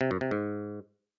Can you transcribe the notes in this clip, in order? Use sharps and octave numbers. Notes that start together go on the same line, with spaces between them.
C3
F#2
C3
G#2